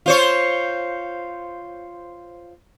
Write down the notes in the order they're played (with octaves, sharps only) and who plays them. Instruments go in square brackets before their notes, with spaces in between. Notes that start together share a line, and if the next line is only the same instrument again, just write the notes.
[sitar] F4 C5 C#5